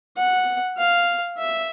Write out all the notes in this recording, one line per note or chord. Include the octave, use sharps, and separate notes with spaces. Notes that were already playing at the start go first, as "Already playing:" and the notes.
F#5
F5
E5